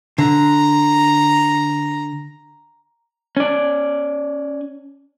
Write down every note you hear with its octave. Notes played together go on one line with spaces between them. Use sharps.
D3 A#5
C#4 D5